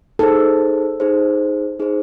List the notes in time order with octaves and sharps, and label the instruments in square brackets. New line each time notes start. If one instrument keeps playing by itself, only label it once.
[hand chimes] D#4 G#4 C5 [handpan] A4
[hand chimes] D#4 G#4 C5
D#4 G#4 C5